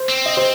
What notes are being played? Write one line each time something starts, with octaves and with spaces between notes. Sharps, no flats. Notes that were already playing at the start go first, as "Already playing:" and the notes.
Already playing: C5
C4
D#5
C5